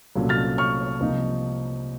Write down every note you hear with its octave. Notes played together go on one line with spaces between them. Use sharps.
C2 A#2 F#3 A3 C#4
F6 A6
C#6 F6
C2 C3 F3 A#3 D#4